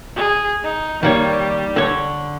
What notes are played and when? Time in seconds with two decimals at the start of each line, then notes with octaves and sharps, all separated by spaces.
0.15 G#4
0.63 D#4
1.03 D#3 G3 A#3 C#5
1.76 D3 A4 C#5